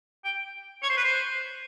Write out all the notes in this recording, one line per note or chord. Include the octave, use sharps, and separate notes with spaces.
G5
C#5
C5
B4
C5